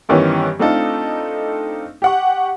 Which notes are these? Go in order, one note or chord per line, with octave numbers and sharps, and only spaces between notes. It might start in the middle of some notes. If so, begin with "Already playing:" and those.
G2 D#3 E3 B3 C#4 G4
A3 C4 D4 D#4 F4 A4
G4 F#5 C#6